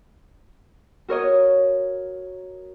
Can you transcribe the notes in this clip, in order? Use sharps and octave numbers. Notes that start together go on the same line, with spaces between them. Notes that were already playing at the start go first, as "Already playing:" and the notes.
F#4 A#4 C#5 D#5